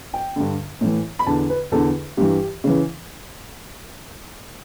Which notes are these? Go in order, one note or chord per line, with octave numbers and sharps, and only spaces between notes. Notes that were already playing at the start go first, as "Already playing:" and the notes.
G5
G2 D3
A2 E3
B5
E2 D3 A5
B4
E2 D3 A4
G2 E3 G4
C#3 E3